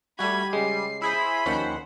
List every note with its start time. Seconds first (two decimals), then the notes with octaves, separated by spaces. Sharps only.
0.19 G3 A3 F#4 B5 G#6 D#7
0.53 C#3 G#3 C7
1.02 E4 G#4 C5 B5
1.46 D#2 D#3 F3 C#4 C5 F#5